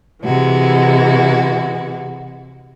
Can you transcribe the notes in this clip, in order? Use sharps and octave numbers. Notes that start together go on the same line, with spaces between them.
C3 E3 G#3 F#4